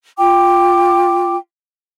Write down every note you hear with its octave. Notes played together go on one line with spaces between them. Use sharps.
F4 G5 D6